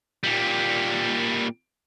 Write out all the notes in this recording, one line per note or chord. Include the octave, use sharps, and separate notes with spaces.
A#2 G3